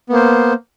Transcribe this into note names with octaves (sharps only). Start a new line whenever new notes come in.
A#3 B3 C5